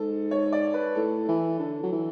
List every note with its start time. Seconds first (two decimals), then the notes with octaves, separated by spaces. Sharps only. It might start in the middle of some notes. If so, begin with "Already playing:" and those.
Already playing: G#2 A4
0.31 C#5
0.53 D5
0.74 B4
0.95 A2 A4
1.28 E3
1.59 D3 A4
1.83 F#3
1.92 E3